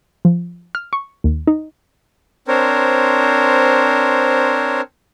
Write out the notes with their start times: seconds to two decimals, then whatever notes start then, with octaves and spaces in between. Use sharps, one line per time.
0.25 F3
0.75 F6
0.93 C#6
1.24 D#2
1.47 D#4
2.48 C4 D4 A#4 C5 C#5